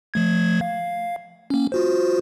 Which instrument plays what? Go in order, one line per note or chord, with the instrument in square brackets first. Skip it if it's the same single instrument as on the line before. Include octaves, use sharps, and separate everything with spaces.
[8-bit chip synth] F3 A3 G#6
F5
A#3 C#4
F4 F#4 C5